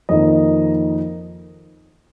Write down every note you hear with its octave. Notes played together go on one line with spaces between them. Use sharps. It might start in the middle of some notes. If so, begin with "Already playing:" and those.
F2 D#3 A#3 D#5